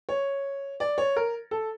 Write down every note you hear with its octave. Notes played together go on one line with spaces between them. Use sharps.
C#5
D5
C#5
A#4
A4